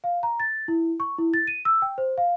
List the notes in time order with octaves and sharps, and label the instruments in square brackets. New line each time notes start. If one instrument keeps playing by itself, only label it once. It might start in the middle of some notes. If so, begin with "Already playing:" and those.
[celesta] F5
A#5
A6
E4
C#6
E4
A6
D#7
E6
G5
C5
F5